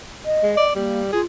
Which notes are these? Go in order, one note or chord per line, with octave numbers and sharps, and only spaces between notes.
D#5
G#3
D5
G3 A#3
F4 G#4